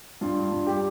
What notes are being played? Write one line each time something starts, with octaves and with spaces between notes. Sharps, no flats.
G2 F4
G2
G4